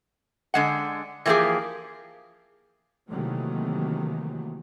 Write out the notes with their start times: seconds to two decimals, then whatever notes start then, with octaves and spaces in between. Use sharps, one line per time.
0.54 D3 G#3 F#5
1.26 E3 F3 A#3 C4 G4 G#4
3.08 C3 D#3 E3 F#3 A3 A#3